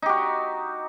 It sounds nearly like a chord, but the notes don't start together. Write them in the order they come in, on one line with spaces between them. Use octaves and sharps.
D#4 G4 F#4